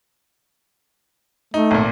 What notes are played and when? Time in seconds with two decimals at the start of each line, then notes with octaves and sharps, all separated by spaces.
1.54 A3 D#4
1.71 G#1 A#2